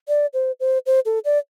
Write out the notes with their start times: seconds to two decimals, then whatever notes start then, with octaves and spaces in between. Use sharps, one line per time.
0.08 D5
0.34 C5
0.60 C5
0.86 C5
1.05 A4
1.25 D5